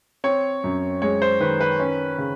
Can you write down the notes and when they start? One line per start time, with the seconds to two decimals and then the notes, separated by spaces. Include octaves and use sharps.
0.24 C4 C#5
0.64 F#2
1.02 G#3 C#5
1.22 C5
1.40 D#3 B4
1.61 B4
1.80 C#4
2.18 C#3